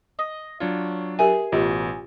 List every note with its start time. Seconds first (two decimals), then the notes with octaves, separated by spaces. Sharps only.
0.19 D#5
0.60 F#3 D4 F4 C#5
1.19 G4 G#4 A#4 E5
1.52 A1 B2 F4 G4 D#5